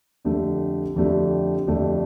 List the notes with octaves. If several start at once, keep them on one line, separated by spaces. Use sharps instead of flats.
F2 D3 A3 D4 G4
F2 D3 A3 D4 G4
F2 D3 A3 D4 G4